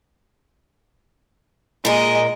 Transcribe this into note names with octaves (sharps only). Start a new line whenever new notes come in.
A#2 G#3 A#4 D#5